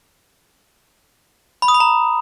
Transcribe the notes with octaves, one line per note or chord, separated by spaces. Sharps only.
B5
D#6
B5
A#5